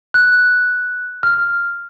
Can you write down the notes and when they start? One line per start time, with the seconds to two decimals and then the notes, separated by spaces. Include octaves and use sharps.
0.14 F#6
1.23 F6